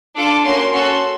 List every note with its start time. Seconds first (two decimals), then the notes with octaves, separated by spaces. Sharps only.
0.16 D4 F4 A4 D6
0.44 A#3 C#4 F#4 C6
0.73 C#4 F#4 A4 C6